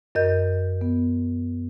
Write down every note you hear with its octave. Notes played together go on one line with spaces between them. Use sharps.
F#2 A#4 D#5 G6
B3